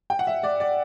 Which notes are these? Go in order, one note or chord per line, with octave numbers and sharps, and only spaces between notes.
G5
F#5
E5
D5
D5